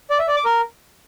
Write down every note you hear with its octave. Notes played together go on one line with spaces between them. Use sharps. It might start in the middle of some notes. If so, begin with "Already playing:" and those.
D5
E5
D5
D6
A#4